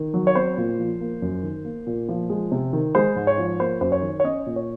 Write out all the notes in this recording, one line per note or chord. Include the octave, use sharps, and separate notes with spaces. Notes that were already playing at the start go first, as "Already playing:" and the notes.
Already playing: D#3
F#3
C#5
C4 C5
A#2
F3
A#3
F#2
D#3
A#3
A#2
F3
G#3
C3
D#3
G#3 C5
G#2
C#5
F3
A#3 C5
F#2 C5
C#5
D#3
C#5
C#4 D#5
A#2
C#5